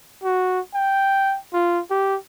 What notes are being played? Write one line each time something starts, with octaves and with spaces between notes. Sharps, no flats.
F#4
G5
F4
G4